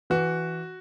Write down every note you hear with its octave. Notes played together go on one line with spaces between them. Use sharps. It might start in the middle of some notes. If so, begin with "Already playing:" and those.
E3 F#4